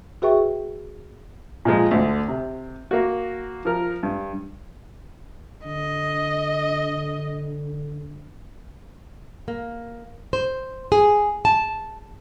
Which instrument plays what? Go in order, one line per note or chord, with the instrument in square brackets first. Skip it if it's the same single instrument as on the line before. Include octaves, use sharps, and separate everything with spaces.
[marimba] F#4 G#4 B4 E5 G5 C#6
[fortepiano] A#2 F3 G#3
D2 D3
C3
A#3 F#4
F3 A#4
G2
[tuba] D3 [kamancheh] D#5
[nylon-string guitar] A#3
C5
G#4
A5